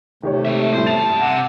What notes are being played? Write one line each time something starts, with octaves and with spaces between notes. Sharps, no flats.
C3 D#3 A3 G4 C#5
G#3 E5
A2 G3 C5
G2 A5 A6 F7
C3 F#5